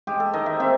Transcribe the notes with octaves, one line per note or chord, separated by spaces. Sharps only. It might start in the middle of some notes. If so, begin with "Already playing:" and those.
G#3 G4
A4
D#3 D#5
E5
C4 E5